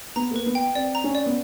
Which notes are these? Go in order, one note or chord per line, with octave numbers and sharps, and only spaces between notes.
B3 A#5
A#3 B4
B3
G5
C4 D5
A#5
C#4
D5
B3